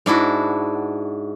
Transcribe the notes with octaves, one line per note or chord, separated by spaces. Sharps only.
G#2 D4 E4 F#4